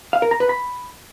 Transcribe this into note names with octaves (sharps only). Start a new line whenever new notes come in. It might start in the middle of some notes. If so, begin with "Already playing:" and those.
F5
A#4
A#5
B4
B5